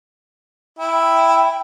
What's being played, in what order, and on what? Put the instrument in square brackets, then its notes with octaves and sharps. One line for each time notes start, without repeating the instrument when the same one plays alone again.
[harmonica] E4 [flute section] G5